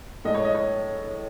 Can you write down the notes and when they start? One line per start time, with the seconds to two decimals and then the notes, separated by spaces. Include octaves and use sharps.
0.25 A2 G#3 D#5
0.34 C#5
0.45 D#5
0.55 C#5